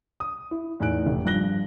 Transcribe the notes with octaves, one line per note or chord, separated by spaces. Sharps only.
D#6
E4
E2 A2 D#4 G#5 F#6 D7
F1
G2 F3 F#6 A#6 G7